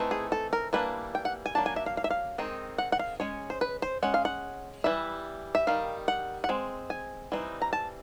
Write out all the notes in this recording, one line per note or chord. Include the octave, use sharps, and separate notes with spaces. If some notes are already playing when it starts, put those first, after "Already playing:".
Already playing: E3 A3 C4 D#4
G#4
A4
A#4
E3 G3 A#3 D4 B4
G5
F#5
G#5
F#3 A#3 D4 A5
G#5
E5
F5
F5
E5
F5
D#3 G#3 C4 D#4
F#5
F#5
F5
G#3 C#4 C#5
C5
B4
C5
G#3 C#4 F#5
F5
F#5
E3 G3 E5
E5
D#3 G3 F5
F#5
F#5
G#3 C4
G#5
E3 G3 C4 D#4
A#5
A5